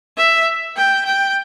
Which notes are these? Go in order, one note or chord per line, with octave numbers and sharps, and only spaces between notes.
E5
G5
G5